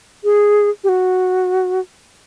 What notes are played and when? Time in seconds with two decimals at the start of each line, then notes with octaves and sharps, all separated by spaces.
0.24 G#4
0.84 G4
0.89 F#4